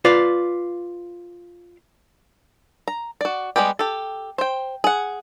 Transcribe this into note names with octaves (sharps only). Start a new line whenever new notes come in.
F4 B4 D5
A#5
F#4 D5
G3 G#3 B3 G4
G4 A4
C5 G5
G#4 F#5